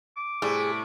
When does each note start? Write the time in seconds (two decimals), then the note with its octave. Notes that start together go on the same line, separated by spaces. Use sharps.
0.17 D6
0.42 A2 C3 G3 G#4